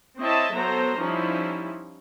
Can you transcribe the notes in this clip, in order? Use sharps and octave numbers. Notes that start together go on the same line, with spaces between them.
C4 E4 C#5 D#5 E5 A5
F#3 B3 A4 C5 A#5
F3 G3 C#4 D#4 E4